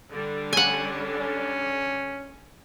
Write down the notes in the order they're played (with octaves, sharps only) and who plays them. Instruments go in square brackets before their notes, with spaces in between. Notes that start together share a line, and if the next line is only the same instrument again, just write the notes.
[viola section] D3 G3 D4
[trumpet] C#4 [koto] F#5 G#5
[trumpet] C#4